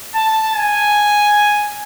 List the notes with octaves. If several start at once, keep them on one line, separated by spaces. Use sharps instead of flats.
A5
G#5